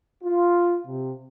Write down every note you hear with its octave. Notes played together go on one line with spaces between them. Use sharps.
F4
C3